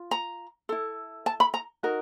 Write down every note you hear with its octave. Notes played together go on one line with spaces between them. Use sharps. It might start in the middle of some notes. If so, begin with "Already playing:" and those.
Already playing: F4
A#5
E4 A4
A5
B5
A#5
D#4 F#4 A#4